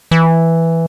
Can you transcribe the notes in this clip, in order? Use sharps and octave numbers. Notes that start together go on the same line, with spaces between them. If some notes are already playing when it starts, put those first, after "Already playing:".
E3